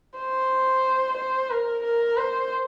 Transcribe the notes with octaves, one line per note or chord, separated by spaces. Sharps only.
C5
C5
A#4
A#4
C5